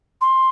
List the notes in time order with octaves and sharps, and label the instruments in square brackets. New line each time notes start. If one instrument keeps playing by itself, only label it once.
[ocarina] C6